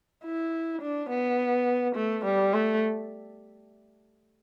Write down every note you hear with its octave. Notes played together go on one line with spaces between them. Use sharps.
E4
D4
B3
A3
G3
A3